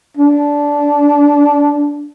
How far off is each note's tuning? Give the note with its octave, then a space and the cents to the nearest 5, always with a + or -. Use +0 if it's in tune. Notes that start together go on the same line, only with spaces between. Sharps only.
D4 -15